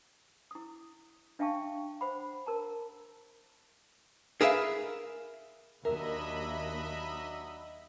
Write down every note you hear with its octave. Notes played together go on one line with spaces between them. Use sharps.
E4 D#6
D4 E5 F5 G5 A5 C#6
C5 F#5 B5
A#4 A5 A#5
G#4 A#4 B4 E5 F5
D#2 F#3 D4 A#4 D#5 E5 B5